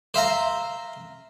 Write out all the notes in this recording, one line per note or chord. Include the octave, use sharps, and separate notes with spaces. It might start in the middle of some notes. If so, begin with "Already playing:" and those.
C5 E5 F5 A#5